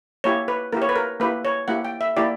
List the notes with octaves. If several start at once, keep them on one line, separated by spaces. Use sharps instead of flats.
A#3 E4 G4 C#5
B4
A#3 E4 G4 A#4
C#5
B4
A#4
A#3 E4 G4 B4
C#5
A#3 E4 G4 F#5
G5
E5
A#3 E4 G4 D5